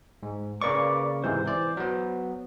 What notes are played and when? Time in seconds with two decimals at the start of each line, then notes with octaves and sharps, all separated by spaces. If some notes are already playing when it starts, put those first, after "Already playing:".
0.23 G#2
0.62 C#3 A#3 B4 D5 C#6 D6
1.24 G#2 C3 E3 C5
1.46 E3 D5
1.77 F#3 B3